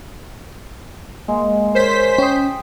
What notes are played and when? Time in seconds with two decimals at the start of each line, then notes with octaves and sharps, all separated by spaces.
1.28 G#3 A#3
1.75 A#4 C5 C#5 B6
2.18 C#4 G5 D#6